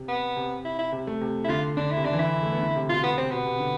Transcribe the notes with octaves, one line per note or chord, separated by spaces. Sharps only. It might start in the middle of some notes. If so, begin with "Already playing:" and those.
Already playing: C3
B3
C3
E4
E4
C3
A3
C3
E4
D3 F4
D3 D4
E4
C3
D3 D4
E3
D3 E4
A3
B3
D3
C3
B2 F4
B3
C3 C4
B2 B3
C3
D3